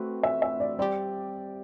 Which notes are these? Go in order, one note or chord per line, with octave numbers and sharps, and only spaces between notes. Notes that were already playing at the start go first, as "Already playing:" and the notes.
Already playing: A3 C4 F#4 B4
E5
E5
D5
G3 C4 G4 D5